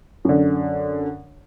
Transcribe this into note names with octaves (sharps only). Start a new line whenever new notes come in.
F#2 D3